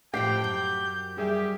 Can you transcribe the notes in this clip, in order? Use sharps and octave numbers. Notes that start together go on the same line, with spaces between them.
A2 F3 C4 G4 G5 C7
F#2 G6
G3 G4 G#4 E5